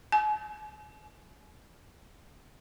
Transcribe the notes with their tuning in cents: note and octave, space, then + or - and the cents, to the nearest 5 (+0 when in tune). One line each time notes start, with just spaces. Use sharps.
G#5 +45